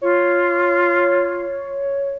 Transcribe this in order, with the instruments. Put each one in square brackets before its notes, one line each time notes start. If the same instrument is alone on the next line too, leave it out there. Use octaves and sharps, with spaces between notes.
[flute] F4 [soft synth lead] C#5